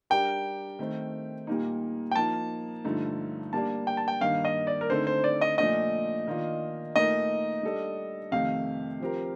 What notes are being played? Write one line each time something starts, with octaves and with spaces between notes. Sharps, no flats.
G3 D4 G4 A#4 G5
D#3 A3 C4
A#2 G3 A#3 D#4
G5
F3 A#3 D#4 A5
G2 D3 F3 A3 D#4
G3 A#3 D4 A5
G5
A5
G5
G2 D#3 A#3 F5
D#5
D5
A#4
D3 A3 C4 D#4 A4 C5
C5
D5
D#5
A#2 F3 A3 D4 D#5
D#3 A#3 D4 F4
A#2 A3 D#4 A#4 D#5
G3 D4 A4
F2 C3 D#3 A3 F5
F3 C4 G4 A#4